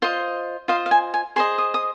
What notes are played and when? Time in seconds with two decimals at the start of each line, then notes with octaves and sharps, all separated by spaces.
0.02 F4 C5 D#5 C6
0.68 F4 C5 D#5 F5
0.86 F5
0.91 G#5
1.14 G#5
1.36 G#4 C5 D#5 C6
1.58 D#6
1.74 D#6